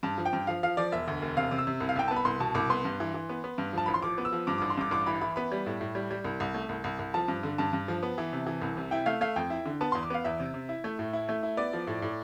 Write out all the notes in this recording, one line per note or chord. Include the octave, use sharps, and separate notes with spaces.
G2 A5
F3
G5
G2
F3 F5
F3 F5
F3 D5
E1 E5
D2
E1
C3 F5
C3
E6
C3
C2
F5
C2 G5
B3 A5
B5
C2 C6
B2 A5
C2 D6
B3 C6
G2
E3
E3
B3
B3
G2
F3 A5
A1 B5
C6
F3 D6
B3
E6
F3
G2 D6
A1 D6
C6
G2 D6
A1 D6
E3 B5
E3 B5
B3 B5
G3
A2
A2
G3
G3
C2
C2
A3
C2
C2
C2
F3 A5
G2
D3
G2 A5
G2
F3
B3
E3
C3
E3
C2
C3
E4 G5
A3 F5
A3 F5
F2 G5
E4
D3
B3 A5
E2 C6
D6
B3 F5
E2 E5
C3
C3
E4
A3
A2
E4
A3
E4
B3 D5
F3
A2
A2